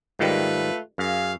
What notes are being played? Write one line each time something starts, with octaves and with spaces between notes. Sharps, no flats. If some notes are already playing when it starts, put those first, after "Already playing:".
G#2 D#3 G3 A3 F4 B4
F#2 G#4 F5